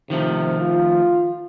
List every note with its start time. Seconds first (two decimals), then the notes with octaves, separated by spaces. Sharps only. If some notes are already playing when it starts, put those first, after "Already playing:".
0.10 C3 D#3 F3 A3
0.60 F4